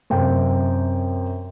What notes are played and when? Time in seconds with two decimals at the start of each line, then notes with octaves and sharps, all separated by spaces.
0.10 F#2 C3 C4 G5